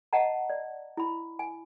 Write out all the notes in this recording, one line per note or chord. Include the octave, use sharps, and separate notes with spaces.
D#5 F#5 A5 A#5
D5
E4 B5
G#5